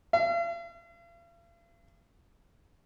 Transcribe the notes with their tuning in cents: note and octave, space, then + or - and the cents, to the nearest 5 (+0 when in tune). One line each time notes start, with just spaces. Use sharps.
F5 -45